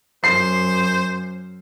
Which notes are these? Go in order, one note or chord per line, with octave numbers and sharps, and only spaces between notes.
F#2 C5 C7